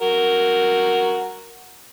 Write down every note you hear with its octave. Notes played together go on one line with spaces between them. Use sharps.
F#4 A#4